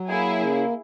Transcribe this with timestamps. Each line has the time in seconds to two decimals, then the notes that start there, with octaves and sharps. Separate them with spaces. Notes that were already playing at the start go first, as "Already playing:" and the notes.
Already playing: F#3
0.09 A#3 E4 G#4
0.39 C#3